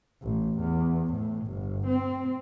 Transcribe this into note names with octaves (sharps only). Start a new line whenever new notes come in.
A1
E2
A2
G1
C4